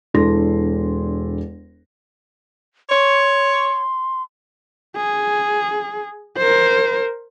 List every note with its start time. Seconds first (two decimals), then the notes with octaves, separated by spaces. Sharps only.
0.14 E1 D4 E4 A4 C6 A#6
2.89 C#5 C6
4.97 G#4
6.38 A#4 C5